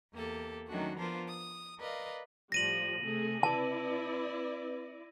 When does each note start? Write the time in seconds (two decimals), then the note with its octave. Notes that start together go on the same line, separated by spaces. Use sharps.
0.13 E2 A#3 G4 A4
0.68 D#3 F#3 A3 C#4 D4 F#4
0.96 F3 B3 D4 F4 A#4 C5
1.29 D#6
1.78 A#4 B4 D5 D#5 F5
2.52 A2 F3 G3 A#6 D#7 F#7
3.02 C3 A3 G#4
3.43 C4 E4 B4 D5 A5